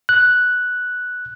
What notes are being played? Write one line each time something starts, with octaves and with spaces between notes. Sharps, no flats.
F#6